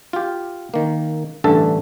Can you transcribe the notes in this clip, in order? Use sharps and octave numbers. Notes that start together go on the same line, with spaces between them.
F4 G4
D#3 A#3
A1 G2 D3 A4 E5 A5